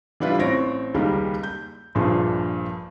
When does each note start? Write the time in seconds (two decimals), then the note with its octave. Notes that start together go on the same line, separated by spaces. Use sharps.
0.20 E3 G3 D4 E4 F4 B4
0.38 A1 C4 C5 C#5 A#6 D7
0.94 C#2 D#3 G3 G#3 A#3
1.43 G6
1.95 A#1 G2 A#2 F3 G#4 C5